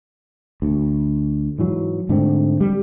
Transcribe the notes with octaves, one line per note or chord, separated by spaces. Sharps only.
D2
G#2 E3 F#3
G#2 D3 A3 C4
G3